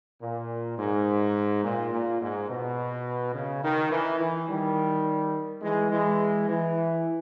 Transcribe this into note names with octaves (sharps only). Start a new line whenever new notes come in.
A#2
G#2
A#2
A#2
G#2
B2
C#3
D#3
E3
E3
D#3 G3
E3 G#3
E3 G#3
E3